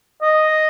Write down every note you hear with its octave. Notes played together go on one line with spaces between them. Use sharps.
D#5